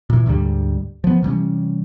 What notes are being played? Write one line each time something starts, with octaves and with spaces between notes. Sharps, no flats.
A#2 E3
D2 G#2 D3 G3
F3 B3
C3 E3 G3 C#4